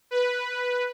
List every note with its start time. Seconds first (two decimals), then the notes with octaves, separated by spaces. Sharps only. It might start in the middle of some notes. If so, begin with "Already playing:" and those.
0.11 B4